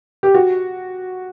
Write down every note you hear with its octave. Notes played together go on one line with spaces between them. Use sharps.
G4
F#4